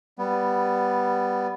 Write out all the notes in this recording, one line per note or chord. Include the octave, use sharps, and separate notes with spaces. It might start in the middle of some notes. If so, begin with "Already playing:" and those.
G3 B3